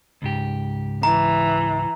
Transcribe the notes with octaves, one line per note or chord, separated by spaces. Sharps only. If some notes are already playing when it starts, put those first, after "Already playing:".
C#2 G#2 G4
E3 A#5